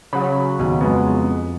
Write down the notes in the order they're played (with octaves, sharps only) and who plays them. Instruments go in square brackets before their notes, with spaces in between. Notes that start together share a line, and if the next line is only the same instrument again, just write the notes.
[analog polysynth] C#3 F#3 [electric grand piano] B5
[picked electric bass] D1 D#2 B2
[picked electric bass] F2 [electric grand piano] G#3 B3